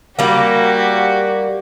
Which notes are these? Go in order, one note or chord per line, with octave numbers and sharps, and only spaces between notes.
G3 A#3 F#4 G4